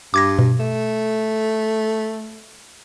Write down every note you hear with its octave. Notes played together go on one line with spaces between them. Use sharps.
G2 D6 G#6 A#6
B2
A3